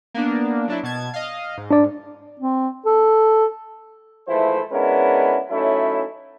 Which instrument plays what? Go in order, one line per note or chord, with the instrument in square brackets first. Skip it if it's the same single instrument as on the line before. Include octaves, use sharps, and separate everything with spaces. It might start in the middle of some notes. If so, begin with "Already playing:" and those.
[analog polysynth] A#3 B3 D4
F#3 D4 E4
B2 A5 G#6
D#5 F5
G#2
[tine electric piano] D4 D5
[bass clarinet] C4
A4
[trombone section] G#2 E3 F3 A3 E4 C5
G#3 B3 C#4 D4 E4 A#4
F#3 A3 C#4 D#4 E4